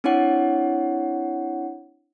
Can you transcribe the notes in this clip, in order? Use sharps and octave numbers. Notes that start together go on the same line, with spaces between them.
C4 D4 E4 C#5 F#5